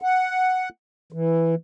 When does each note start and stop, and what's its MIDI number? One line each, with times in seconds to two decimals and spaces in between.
0.02 0.69 78
1.12 1.55 52